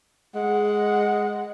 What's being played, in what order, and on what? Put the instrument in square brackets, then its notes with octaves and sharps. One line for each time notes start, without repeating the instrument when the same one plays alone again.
[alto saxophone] G#3 [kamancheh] F#5